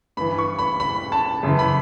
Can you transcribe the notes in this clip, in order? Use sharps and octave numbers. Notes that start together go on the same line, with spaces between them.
G2 E3 B5
C#6
B5
B5
A5
F#2 C#3 E3
B5